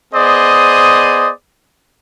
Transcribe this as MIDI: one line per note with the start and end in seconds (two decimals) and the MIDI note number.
0.14 1.31 59
0.14 1.31 68
0.14 1.31 72
0.14 1.31 74
0.14 1.31 75
0.14 1.31 87